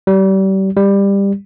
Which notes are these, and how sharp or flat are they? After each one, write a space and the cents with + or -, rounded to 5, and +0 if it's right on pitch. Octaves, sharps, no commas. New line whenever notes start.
G3 -30
G3 +20